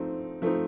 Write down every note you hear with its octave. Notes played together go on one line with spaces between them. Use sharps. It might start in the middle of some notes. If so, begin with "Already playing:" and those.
Already playing: F3 A3 C4 D#4
F3 A3 C4 D#4